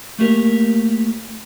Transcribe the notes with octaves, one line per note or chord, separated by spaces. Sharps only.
A3 A#3 G4 A#4